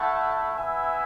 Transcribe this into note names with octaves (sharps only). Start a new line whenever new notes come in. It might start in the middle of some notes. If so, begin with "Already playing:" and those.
Already playing: A3 E4 F#5 A5
B3 E4 E5 G#5